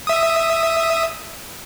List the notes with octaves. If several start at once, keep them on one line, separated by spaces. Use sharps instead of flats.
E5 D#6